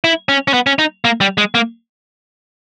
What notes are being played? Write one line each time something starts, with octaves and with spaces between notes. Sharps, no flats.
E4
C#4
C#4
B3
C#4
D#4
A#3
G3
G#3
A#3